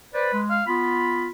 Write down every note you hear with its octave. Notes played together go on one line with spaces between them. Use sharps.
B4 C5 D5
G#3
F5
B3 F4 B5